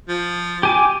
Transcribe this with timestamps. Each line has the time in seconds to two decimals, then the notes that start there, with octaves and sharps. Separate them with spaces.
0.09 F3
0.63 G4 G#5 D6